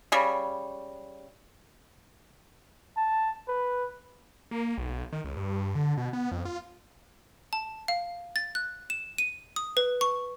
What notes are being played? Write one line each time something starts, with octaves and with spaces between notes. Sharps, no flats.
C#3 G3
A5
B4
A#3
B1
D#3
C#2
G2
G2
D3
B2
B3
F2
F4
A5
F5
A6
F#6
E7
D#7
D#6
B4
C#6